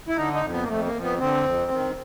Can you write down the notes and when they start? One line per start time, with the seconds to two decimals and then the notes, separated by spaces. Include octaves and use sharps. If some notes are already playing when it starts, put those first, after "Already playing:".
0.08 E4
0.17 D3 D#4
0.34 D#4
0.43 F2
0.52 B3
0.63 A#3
0.69 F2 A3
0.86 A#3
0.94 F2
1.03 B3
1.19 D3 C4
1.45 F2
1.71 D#3